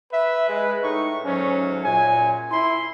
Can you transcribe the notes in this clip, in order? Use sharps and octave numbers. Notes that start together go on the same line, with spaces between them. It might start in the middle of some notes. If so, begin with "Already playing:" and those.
B4 E5
G#3
A2 D#4 C#6
D2 G#2 F#3 C#4
F#2 A#2 G#5
E4 C6